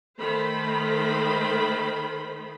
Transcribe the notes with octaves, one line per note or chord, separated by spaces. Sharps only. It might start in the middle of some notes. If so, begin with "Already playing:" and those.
D#3 A3 C5 B5